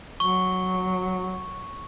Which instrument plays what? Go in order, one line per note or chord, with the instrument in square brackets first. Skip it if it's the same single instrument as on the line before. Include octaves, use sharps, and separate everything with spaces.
[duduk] F#3 [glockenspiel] C#6 G7